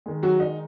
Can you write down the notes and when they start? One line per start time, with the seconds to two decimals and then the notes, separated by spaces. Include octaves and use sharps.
0.06 D#3 G#3
0.23 F#3 F#4
0.40 D#4